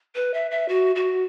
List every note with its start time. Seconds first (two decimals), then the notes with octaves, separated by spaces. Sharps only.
0.15 B4
0.34 E5
0.51 E5
0.69 F#4
0.96 F#4